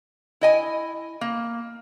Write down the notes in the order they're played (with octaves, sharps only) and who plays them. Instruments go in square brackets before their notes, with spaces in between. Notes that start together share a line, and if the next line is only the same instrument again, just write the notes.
[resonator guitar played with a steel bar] E4 D#5 G#5
A#3